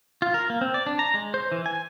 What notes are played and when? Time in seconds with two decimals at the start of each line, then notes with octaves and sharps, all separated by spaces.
0.22 F4
0.34 A#4
0.50 A#3
0.61 C4
0.74 D5
0.87 D4
0.99 A#5
1.14 G#3
1.34 C5
1.52 E3
1.66 G#5